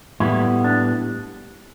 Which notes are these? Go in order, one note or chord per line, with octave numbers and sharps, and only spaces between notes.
A2 G3 B3 E4
D4